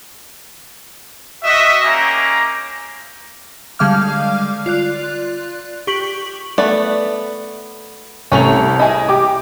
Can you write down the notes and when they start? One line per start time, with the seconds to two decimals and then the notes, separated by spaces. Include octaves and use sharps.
1.44 F#4 D#5 E5
1.82 G#3 A#3 C#4 G4 A#5 D6
3.79 D3 G3 G#3 F5 D6 F6
4.66 F4 D5 F#6
5.87 G4 C#6 B6 F#7
6.58 A3 B3 D5
8.32 C2 A3 C#4 F7
8.79 E4 G#4 D#5 G#5
9.09 G4 D6